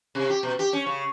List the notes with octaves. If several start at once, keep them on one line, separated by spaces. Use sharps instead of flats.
C3
G4
B2
G4
C#4
C#3